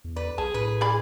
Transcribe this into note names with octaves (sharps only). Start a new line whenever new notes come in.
E2
B4 D5
B1 G#4 A5
A2 B4
G#3 G#4 D5 B5